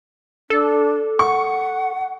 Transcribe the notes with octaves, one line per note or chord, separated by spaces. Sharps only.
D4 A4
F#5 C#6